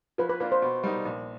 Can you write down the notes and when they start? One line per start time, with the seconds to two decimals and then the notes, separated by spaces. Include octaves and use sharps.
0.18 F3 B4
0.29 B4
0.40 A#3 D4 F4 B4
0.52 C5
0.62 B2
0.83 G3 B3 D#4
1.05 A#1